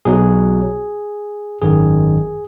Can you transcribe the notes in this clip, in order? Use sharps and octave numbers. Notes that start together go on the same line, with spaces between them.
B1 B2 F#3 G#4
G#1 F#2 D#3 G#4